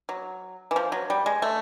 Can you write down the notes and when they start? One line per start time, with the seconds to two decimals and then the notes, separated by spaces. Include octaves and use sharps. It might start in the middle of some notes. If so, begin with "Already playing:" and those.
0.09 F#3
0.71 E3
0.76 F3
0.92 F#3
1.10 G3
1.26 G#3
1.42 A3